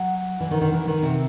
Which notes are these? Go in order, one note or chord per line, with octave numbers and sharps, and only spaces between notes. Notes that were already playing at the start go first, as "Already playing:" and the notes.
Already playing: F#3
E3
D#3
D#3
E3
D#3
C3